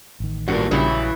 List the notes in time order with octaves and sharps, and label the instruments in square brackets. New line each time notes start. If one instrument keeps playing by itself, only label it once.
[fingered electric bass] A1 D#3
[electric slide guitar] E2 D3 D4 [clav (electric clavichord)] G2 A#2 [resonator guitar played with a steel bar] F#4
[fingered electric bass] A#1 [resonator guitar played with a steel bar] C#3 F#3 G3 [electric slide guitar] E3 E4